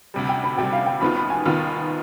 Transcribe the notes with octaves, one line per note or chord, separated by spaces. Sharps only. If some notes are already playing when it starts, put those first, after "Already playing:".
D2 C3 G3
G5
B5
D2 C3 G3 G5
F5
G5
D#2 D#3 B3 F4 B5
B5
G#5
D#2 D#3 B3 F4